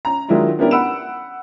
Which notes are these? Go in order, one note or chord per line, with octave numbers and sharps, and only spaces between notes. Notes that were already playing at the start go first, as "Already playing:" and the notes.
C#4 A#5
D#3 F#3 G#3 D4 E4 F4
B3 C#4 D4 E4 G4 A#4
F#5 B5 E6 D7 E7